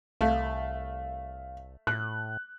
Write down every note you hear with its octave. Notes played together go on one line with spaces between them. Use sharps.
C2 A3 F5
A2 F#6